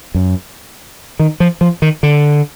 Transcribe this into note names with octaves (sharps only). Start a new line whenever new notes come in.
F#2
D#3
F3
F3
D#3
D3